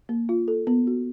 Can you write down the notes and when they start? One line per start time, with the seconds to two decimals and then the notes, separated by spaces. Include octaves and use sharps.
0.09 A#3
0.29 F4
0.48 A4
0.67 B3
0.87 F#4